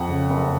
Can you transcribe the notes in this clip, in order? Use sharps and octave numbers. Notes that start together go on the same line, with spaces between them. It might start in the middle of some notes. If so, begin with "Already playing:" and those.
Already playing: F2 F#5
C#3
F#1